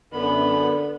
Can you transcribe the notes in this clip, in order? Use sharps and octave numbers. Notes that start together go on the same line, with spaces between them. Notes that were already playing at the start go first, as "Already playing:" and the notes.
F#2 D3 B3 B5